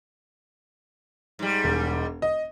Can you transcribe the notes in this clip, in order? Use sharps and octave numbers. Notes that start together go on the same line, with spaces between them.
G#2 G3
E1
D#5